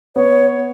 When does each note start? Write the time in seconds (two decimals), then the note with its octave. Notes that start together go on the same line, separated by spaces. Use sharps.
0.16 B3 C#5